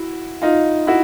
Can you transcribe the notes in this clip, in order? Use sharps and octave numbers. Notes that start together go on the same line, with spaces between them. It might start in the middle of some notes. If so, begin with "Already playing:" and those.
Already playing: E4 F#4
D#4 F4
E4 F#4